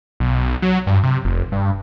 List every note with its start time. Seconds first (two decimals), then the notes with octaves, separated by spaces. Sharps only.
0.20 B1
0.62 F#3
0.87 G2
1.03 C3
1.25 F1
1.52 G2